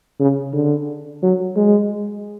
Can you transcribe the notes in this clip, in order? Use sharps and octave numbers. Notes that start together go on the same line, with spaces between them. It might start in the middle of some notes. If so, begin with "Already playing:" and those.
C#3
D3
F#3
G#3